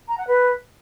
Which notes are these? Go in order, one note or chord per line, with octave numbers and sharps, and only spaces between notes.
A#5
F#5
B4